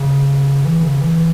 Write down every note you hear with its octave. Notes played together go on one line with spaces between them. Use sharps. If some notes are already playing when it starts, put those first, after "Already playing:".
Already playing: C#3
E3
C#3
E3